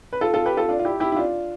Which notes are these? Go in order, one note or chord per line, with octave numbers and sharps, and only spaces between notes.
B4
F4 A4
F4 A4
G4 B4
F4 A4
D4 F4
F4
E4 G4
E4 G4
E4
D4 F4